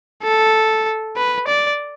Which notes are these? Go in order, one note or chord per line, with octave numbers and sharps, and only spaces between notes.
A4
B4
D5